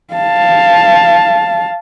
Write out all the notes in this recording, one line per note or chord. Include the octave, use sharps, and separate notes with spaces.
F5 A5